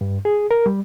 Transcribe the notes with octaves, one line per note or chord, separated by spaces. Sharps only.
G2
G#4
A#4
G3